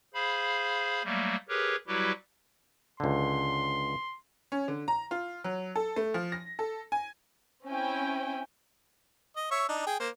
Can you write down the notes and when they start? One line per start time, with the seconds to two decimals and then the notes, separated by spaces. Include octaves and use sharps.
0.14 G#4 C5 F5 B5
1.04 F#3 G3 A3 A#3
1.49 G4 G#4 A#4 B4 C#5
1.87 F#3 G3 E4 F#4 G4 B4
3.00 C#2 D3 C6
4.52 C#4
4.68 D3
4.88 A#5
5.11 F4
5.44 F#3
5.76 A4
5.96 A3
6.14 F3
6.32 A#6
6.59 A4
6.92 G#5
7.66 C4 C#4 E4 G5 G#5
9.36 D#5
9.51 C#5 E5
9.69 D4 D#4
9.87 G#4 G5
10.00 A#3 C5